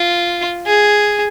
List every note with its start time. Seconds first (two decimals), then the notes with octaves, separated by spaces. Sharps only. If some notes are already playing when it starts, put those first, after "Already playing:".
Already playing: F4
0.66 G#4